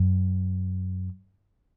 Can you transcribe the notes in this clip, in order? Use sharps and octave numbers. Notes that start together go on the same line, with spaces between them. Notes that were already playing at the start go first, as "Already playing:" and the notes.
Already playing: F#2